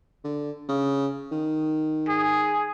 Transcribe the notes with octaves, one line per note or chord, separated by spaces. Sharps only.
D3
C#3
D#3
G#4